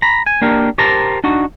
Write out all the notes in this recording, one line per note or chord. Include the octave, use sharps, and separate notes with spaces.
A#5 B5
G#5
A#3 D4 G4 A#4
G4 A#4 C5 A5 A#5
D4 D#4 F#4